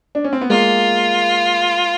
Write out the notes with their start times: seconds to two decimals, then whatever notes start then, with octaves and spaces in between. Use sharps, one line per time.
0.15 D4
0.24 C#4
0.33 C4
0.41 B3
0.50 G#3 A#3 F4